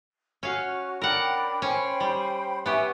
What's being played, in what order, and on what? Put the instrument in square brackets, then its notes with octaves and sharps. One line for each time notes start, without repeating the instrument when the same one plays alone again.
[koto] C#4 F5 [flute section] F#4
[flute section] D4 G5 B5 [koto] A#4 F#5
[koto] C#4 [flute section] C5 G5 B5
[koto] G3
[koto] B3 G4 [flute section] E5 G#5 C#6